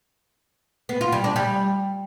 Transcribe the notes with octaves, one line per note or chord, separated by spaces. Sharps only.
B3
F4
G3
D4
G3